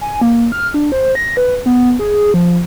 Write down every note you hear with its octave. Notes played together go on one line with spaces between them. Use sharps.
G#5
A#3
F6
D4
C5
A#6
B4
B3
G#4
F3